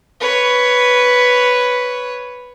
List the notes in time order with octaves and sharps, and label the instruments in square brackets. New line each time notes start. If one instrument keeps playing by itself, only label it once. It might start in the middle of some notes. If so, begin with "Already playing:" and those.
[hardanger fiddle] B4 C#5